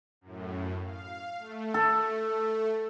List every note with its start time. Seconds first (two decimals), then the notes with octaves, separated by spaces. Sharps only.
0.21 F#2 A2
0.84 F5
1.39 A3
1.74 A4